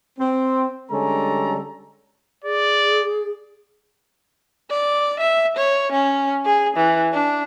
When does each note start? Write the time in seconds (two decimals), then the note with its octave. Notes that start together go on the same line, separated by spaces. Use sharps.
0.19 C4
0.91 D3 G3 G#3 C#4 A4 A#5
2.44 G#4 D5
4.70 D5
5.20 E5
5.57 C#5
5.92 C#4
6.45 G#4
6.77 E3
7.13 D4